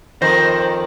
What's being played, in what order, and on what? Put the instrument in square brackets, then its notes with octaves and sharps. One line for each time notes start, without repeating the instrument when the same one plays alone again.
[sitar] F2 [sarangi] D#3 [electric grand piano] C5 [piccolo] A#6